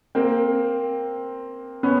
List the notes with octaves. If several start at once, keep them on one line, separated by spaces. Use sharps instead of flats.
A#3 C4
B3 C#4